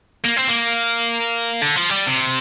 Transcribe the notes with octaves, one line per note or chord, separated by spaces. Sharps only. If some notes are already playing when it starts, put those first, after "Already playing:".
A#3
C4
A#3
D3
F3
G3
C3